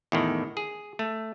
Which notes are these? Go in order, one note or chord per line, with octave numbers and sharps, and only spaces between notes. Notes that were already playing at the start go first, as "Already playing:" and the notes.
E2 A2 D#3
G#4
A3